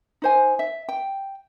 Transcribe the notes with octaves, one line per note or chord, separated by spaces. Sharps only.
D#4 C5 G#5
E5
G5